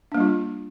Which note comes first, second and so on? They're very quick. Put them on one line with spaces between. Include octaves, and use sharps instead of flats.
D4 A#3 G3 F4